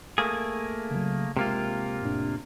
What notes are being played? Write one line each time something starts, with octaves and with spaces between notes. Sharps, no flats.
A3 A#3 G#4
C#3 F#3
C3 G#3 A#3 F4
F2 A2 D4